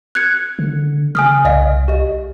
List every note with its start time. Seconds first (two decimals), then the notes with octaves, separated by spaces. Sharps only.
0.15 F#6 G#6 C#7
0.59 D3
1.15 C#3 G#5 D#6 F6
1.45 C2 D5 D#5 F5
1.88 G4 D#5